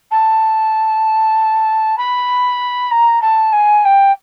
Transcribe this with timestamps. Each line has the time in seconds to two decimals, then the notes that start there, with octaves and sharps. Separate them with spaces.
0.11 A5
1.97 B5
2.91 A#5
3.21 A5
3.52 G#5
3.85 G5